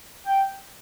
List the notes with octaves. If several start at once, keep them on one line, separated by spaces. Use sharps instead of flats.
G5